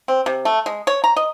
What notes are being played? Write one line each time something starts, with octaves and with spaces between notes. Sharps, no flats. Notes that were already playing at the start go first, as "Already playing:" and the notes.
C4
C3
A3
G#3
C#5
A#5
D#5